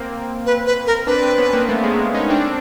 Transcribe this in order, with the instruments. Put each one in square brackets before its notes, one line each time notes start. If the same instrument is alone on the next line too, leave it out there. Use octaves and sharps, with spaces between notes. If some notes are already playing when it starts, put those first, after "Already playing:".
Already playing: [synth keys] A#3 C4
[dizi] B4
B4
A#4
[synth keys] C4 D4 [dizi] B4
[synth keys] C4 D4
B3 C#4
A#3 C4
A3 B3
G#3 A#3
C#4 D#4
C4 D4